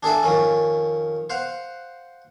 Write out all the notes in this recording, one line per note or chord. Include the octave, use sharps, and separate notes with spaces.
D4 G#4 A4 E5
F2 D#3 C#4
C5 F5 F#5